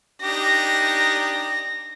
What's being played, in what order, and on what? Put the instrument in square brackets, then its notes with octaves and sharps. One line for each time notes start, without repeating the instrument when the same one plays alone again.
[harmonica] D4 D#4 G4 [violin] A#6